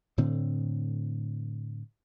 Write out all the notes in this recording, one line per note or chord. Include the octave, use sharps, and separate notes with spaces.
A2 D3 C4